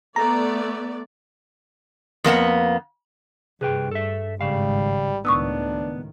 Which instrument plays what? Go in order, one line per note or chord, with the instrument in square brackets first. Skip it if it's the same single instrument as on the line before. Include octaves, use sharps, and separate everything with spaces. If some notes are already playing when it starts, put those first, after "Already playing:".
[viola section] A3 B3 D5 [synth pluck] A#5
[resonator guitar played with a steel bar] F2 A#3 B3 F#5
[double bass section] G2 [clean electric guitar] C3 B4 G5 [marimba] G#4
[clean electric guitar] A4 E5
[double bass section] G#1 [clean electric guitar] C#3 F5 [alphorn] G3
[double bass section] C#2 A2 D#3 [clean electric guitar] B3 [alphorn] D4 [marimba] C#6 D#6 E6